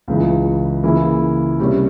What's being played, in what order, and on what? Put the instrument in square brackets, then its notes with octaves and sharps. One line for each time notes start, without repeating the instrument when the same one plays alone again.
[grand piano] C#2 C#3 E3
C#3 E3 A#3 E4
C3 G3 A#3 C#4